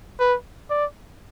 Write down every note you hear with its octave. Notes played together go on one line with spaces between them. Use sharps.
B4
D5